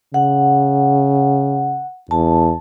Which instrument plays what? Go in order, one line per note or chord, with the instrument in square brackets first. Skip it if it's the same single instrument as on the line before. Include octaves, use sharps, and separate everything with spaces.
[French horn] C#3 [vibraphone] F#5
[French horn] E2 [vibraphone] A5